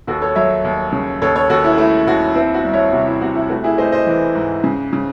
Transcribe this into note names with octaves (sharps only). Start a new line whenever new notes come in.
D#2 F#4 A4
A4 C#5
F#3 C#5 E5
D#2
C#3
D#2 A4 C#5
A4 C#5
D#2 F#4 A4
E4
A3 E4
D#2 F#4
C4 E4
F#4
C2
C#5 E5
C3 F#4
E4
C3 F#4
E4
A3 F#4
E4 G#4
A3 C5 D#5
C5 D#5
E3
G#2
C#3
C#3